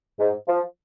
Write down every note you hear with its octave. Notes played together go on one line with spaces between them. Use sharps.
G#2
F3